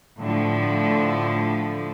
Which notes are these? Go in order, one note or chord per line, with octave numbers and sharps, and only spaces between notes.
A2 D3 F3